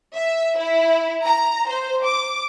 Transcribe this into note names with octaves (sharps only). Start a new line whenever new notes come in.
E5
E4
A#5
C5
D6